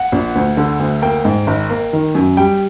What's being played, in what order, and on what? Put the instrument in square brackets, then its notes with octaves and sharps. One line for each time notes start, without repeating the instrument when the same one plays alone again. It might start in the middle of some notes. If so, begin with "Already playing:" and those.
Already playing: [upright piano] F#5
A#1
D2
D3
D2
A#3 G5
G#2
G#1
A#3
D#3
F#2
G3 G5